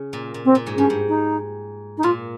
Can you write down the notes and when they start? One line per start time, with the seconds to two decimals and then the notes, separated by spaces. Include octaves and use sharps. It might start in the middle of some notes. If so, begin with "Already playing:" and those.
Already playing: C#3
0.13 A#2
0.34 A#2
0.44 C4
0.55 A#2
0.67 G#2
0.76 G2 C#4
0.90 G#2
1.08 D#4
1.97 D#4
2.03 A#2 F4